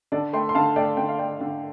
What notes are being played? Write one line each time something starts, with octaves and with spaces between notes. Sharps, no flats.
D3 A4 D5
A3 G5 C6
C6
D3 F5 A5
A3 D5 G5
D3 G5
F5
A3 D5 G5
D3